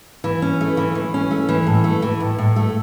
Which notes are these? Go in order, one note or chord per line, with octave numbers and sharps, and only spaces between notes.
E3
C#4
A3
E3
E3
C#4
A3
E3
A2
A3
E3
A2
A2
A3